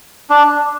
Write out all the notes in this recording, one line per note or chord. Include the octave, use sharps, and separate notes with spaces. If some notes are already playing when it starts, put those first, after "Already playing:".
D4